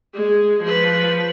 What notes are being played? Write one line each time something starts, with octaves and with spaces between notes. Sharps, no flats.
G#3
F3 B4